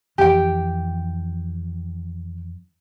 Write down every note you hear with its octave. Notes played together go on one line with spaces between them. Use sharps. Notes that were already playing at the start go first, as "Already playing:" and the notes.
F2 E3 G4 G5